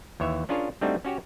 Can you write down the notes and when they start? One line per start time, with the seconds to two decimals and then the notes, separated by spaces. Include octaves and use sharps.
0.20 D#2 E3 C#5 E5
0.49 C#4 D4 F4 G#4 A#4 C#5
0.81 G3 A3 C4 D4 D#4 F#4
1.05 C#4 F#4 G4 C#5